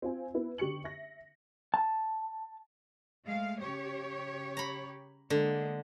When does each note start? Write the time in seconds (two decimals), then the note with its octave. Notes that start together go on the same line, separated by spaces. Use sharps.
0.02 C4 F4 G#5
0.34 B3 E4 B4
0.58 D3 G4 C#6 C#7 F#7
0.84 E5 A#6
1.74 A5
3.25 G#3 A3 F5
3.59 C#3 G4 C#5
4.57 A#5 B5
5.30 D3 G#3 A#3